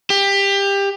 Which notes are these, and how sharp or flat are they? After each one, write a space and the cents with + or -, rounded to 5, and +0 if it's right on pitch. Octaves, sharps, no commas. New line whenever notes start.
G4 +20